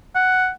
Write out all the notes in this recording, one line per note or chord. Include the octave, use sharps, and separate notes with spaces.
F#5